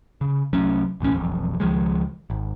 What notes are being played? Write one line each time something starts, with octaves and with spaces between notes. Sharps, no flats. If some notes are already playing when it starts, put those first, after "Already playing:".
C#3
C2 F#3 A3 C#4
B1 E2 A2 C#4
E1 B1 F2
C#2 D#3 F3 G#3
G#1